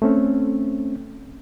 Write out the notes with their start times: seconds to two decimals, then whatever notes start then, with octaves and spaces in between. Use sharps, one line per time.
0.02 A3 C4 C#4